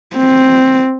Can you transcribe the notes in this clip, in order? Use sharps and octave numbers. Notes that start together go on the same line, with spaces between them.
C4